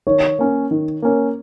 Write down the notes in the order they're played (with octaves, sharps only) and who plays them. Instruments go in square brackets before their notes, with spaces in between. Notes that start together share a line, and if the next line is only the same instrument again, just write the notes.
[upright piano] D#3 [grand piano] C#5
[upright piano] A#3 C#4
D#3
A#3 C#4